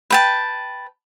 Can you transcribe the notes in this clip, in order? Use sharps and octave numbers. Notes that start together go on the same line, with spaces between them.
B4 G5 A5